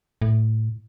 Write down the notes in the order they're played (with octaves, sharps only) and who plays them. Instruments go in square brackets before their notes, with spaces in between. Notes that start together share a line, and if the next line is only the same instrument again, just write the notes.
[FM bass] A2